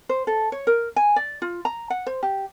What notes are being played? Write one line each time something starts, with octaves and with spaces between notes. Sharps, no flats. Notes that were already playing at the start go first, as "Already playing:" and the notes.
C5
A4
C#5
A#4
G#5
D5
F4
A#5
F#5
C5
G4